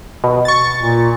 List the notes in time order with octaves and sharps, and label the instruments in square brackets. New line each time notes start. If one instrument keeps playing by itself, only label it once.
[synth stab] B2
C#6 A6
[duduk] A#2